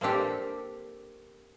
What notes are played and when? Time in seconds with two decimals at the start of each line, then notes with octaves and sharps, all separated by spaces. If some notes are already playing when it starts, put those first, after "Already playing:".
0.01 A#3 C4 D4 G4 A4